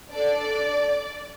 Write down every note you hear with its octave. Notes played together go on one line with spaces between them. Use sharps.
D4 A4 D5